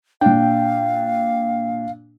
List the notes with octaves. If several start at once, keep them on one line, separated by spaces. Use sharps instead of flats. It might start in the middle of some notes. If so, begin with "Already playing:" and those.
A#2 D4 F5 G5